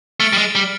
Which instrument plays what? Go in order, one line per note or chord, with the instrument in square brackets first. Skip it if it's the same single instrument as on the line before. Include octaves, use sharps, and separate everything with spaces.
[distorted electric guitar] A3 [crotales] F6 A6 D7
[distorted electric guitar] G3
G#3
G3